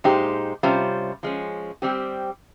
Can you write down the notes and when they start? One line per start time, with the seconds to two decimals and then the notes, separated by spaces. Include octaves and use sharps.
0.04 A#2 G#3 D#4 G4 C5
0.63 C3 G3 C#4 F4 C5
1.23 F3 G#3 C#4
1.82 G3 C4 G4